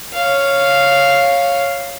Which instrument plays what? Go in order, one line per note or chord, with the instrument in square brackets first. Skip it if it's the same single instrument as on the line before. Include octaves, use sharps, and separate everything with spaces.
[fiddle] C#5 F5